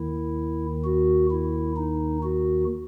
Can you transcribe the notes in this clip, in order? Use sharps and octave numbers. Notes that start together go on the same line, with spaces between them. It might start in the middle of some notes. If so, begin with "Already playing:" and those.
Already playing: D#2 D#3 E4
F#4
E4
D#4
F#4